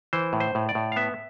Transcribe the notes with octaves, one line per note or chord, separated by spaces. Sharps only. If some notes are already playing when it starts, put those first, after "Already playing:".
E3 C5
A2
C5
A2
D5
A2
F5
B3 E5